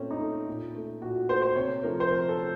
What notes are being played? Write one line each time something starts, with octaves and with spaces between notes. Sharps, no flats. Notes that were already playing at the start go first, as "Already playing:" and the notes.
Already playing: A#2 A3 C4 C#4
D#4
A3
A#2
A3
A#2 F#4
A3 C5
C5
C3 C#5
F3 A3 A#4
C5
C3 A#4
A4
A3